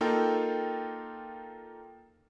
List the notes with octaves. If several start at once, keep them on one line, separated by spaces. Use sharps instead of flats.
A#3 D#4 F4 A4 A#4 G5